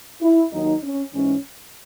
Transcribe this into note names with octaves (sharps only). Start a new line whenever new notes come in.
E4
D#2 D#3 F#3 D#4
C#4
G#2 E3 G#3 C#4